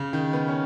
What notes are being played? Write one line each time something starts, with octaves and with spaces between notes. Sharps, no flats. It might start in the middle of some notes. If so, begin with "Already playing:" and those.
Already playing: C#3
D#3
B3
C#4